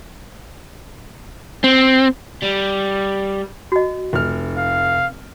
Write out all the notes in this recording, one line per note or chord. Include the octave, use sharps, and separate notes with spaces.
C4
G3
F#4 D#5
F1 F6
F5